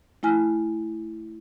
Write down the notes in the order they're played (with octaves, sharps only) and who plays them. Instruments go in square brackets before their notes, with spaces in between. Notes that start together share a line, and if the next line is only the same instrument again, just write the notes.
[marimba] A3 E4 G#5 F6